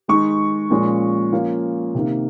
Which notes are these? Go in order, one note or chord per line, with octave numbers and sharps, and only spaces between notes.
D#3 G#3 D#4 C#6
A#2 F3 G#3 C#4
F3 A#3 C#4
C3 D#3 A#3